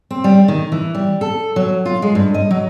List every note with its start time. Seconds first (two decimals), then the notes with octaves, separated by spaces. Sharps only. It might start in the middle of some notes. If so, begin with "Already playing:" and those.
0.11 C4
0.24 G3
0.48 D#3
0.72 E3
0.95 G3
1.21 A4
1.56 F#3
1.85 F4
2.02 G#3
2.15 G2
2.34 D#5
2.51 F#3